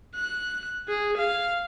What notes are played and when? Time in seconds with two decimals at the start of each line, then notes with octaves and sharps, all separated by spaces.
0.15 F#6
0.88 G#4
1.17 F5